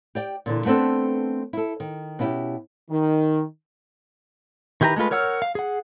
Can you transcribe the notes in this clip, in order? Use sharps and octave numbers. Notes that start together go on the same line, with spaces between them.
G4 D5 G5
A#2 D3 E3
A3 B3 C4 D4 A4
E4 A4
D#3
B2 C#4 E4 F4 G4
D#3
D#3 E4 G4 B4 A#5
G#3 A3 F4 B4
A#4 C#5 F#5 E6 F6
F5
G#4 F#5